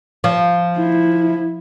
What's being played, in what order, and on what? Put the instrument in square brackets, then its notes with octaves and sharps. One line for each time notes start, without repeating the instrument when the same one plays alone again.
[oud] F3
[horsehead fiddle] E4